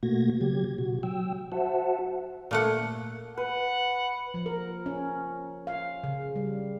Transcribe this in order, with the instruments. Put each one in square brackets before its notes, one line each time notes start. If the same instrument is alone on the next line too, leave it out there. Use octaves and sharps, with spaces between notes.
[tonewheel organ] B2 A3 A#3 F#4 G#6 A#6
C#3 F#3 G4 G#6
B2 F#4
F#3 G5 E6
F#4 C5 E5 F#5 A5
[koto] A#2 A3 F#5
[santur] B4 [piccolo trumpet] F#5
[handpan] F3
A#4
C#4
F5
C#3
G3